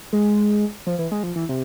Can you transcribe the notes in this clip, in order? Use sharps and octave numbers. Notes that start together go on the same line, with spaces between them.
G#3
F3
E3
G#3
F3
E3
C3